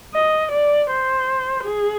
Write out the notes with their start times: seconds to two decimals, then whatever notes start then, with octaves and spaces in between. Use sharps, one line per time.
0.14 D#5
0.52 D5
0.90 C5
1.64 G#4